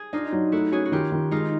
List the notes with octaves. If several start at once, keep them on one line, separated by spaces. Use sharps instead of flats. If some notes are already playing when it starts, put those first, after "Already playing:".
Already playing: G#4
D4 D#4 F4
F#3
A3 E4 F#4
C#4 F#4 G#4
F#4
D#3 F4 G4
D#3
G#3 D#4 F4